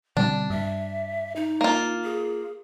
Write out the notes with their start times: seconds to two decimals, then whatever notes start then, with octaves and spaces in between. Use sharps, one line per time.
0.17 B2 D3 G3 C4 D4
0.50 G2 E5
1.36 D#4
1.61 A#3 F4
2.04 G#4